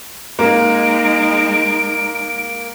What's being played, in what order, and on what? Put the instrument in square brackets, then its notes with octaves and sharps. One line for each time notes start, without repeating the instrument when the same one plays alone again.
[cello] G#3 D#4 [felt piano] A#3 [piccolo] D7